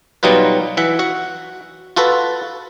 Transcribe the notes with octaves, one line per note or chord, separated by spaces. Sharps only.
B2 F#3 G3 D#4 F4 B4
E3 E5 F#5
F#4 F#5
F4 F#4 A4 B4